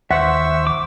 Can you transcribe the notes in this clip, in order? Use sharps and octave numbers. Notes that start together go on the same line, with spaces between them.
D#2 C5 E5 F#5 C#6 E6
D6